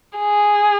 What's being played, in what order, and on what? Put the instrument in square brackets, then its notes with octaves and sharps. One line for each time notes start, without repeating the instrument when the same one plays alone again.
[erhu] G#4